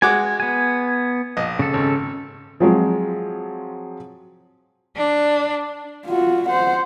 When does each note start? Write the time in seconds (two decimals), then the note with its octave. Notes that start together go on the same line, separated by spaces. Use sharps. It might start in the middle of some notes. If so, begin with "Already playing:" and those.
0.02 G#3 F#4 G#5 D6
0.40 B3 G#5
1.37 A#1 D#5
1.59 C#3 A4
1.73 G#1
2.60 F3 F#3 G#3 C4
4.96 D4
6.07 F4 F#4
6.50 C5 F#5